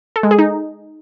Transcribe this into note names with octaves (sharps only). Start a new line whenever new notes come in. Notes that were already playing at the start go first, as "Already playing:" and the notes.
A4
G#3
G#4
D#4